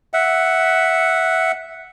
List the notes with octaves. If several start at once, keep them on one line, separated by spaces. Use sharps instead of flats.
E5 F#5